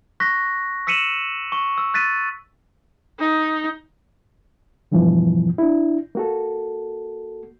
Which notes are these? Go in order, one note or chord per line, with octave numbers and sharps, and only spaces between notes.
C#6 F#6 A#6 B6
E6 B6 C#7 D#7 E7 F#7
C#6
E6
F#6 A6 B6 D#7
D#4
E2 G2 B2 E3 F3
D4 E4
A#3 F#4 A4